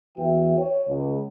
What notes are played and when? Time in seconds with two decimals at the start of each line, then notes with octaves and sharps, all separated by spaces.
0.17 E2 E3 F#4 E5 G5
0.58 C#5
0.88 C#2